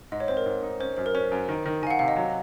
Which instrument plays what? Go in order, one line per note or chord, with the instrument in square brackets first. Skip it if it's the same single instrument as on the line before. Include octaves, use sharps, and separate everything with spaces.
[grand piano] G#2 [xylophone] D#5
[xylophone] C#5
[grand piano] C4 [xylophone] C5
[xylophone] A#4
[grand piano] G#2
D#4
[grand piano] C#4 [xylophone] C5
[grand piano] F#2 [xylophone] C5
[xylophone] A#4
[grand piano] C#4 [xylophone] C5
[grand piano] F#2
D#3
D#3
[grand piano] D#3 [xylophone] F5 G#5
[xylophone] F#5
[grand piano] C3 [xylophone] F5
[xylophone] D#5
[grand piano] F#3